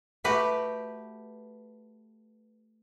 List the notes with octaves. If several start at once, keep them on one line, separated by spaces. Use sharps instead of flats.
A3 F#4 G4 B4